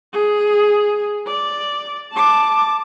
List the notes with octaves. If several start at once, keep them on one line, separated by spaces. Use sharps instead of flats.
G#4
D5
A5 D6